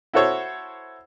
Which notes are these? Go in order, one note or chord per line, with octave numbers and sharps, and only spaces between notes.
E4 F#4 A4 C5 C#5